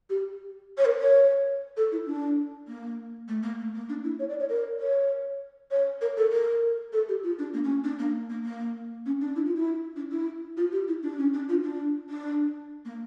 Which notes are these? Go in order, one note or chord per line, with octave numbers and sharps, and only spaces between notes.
G4
C#5
A#4
C#5
A4
E4
D4
A#3
A3
A#3
A3
A#3
D4
E4
C#5
D5
C#5
A#4
C#5
C#5
A#4
A4
A#4
A4
G4
F4
D4
A#3
C#4
D4
A#3
A#3
A#3
C#4
D4
E4
F4
E4
D4
E4
F4
G4
E4
D4
C#4
D4
F4
D4
D4
A#3